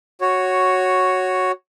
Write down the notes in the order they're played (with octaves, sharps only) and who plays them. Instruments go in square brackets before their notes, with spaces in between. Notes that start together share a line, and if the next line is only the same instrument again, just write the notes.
[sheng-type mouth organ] F#4 C#5